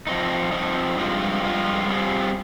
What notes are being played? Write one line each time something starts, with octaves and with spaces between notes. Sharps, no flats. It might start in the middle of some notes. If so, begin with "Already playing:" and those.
F3 C4 D#4
F3 C4 D#4
G2 F3 G#3 C4 F4
G2 F3 G#3 C4 F4
G3 C4 F4 G#4